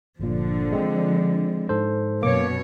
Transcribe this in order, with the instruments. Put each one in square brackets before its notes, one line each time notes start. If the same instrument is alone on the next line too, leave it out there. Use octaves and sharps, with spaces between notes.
[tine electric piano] G1 A#2 [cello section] D3 F3
[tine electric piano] G#3 C4
G#2 A4 C5
[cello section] F#2 B2 C#5 [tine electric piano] A#3 D6